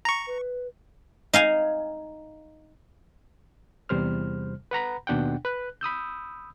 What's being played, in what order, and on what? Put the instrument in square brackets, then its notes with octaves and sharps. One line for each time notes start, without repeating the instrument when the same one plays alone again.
[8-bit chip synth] A#5 C#6
[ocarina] B4
[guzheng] D#4 F5 G#5
[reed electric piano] E2 C3 G3 C5 F6
B4 F#5 A#5 B5
D#2 B2 D4 F#5 G5
B4 F#6
B5 D#6 E6 G6